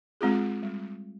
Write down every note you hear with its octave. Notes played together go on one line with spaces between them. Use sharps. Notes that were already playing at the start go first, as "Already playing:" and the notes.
G#3 C4 F4 G#4
G3